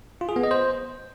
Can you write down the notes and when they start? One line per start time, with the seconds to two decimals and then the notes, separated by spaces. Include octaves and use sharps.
0.21 F4
0.29 G#4
0.36 B3
0.44 D#5
0.51 C5